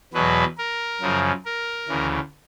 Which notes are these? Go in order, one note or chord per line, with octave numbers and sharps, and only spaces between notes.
E2 B2 F#3 B4
A#4
F#2 C#3 F3
A#4
D2 C#3 E3